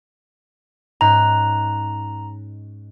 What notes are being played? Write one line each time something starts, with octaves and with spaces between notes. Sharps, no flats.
G#2 C#4 A#5 F#6